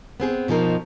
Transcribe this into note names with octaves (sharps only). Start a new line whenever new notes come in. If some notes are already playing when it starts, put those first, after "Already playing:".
B3 C4 G#4
B2 F3 D#4 A#4